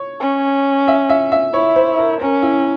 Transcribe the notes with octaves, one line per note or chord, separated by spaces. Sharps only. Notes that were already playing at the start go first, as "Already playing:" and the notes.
Already playing: C#5
C#4
E5
E5
E5
E4 C#5
C5
A#4
C#4 A#4
E4